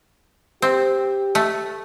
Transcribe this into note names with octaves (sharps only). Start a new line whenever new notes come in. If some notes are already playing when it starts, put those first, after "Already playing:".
C4 G4
A3